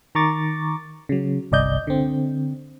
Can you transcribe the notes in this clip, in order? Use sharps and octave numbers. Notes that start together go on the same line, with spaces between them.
D#3 A#5 C#6 D6 A6
C#3 F#3
G1 C2 D5 D#5 G6
D3 C4